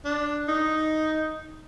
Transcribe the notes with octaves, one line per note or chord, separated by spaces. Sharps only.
D4
D#4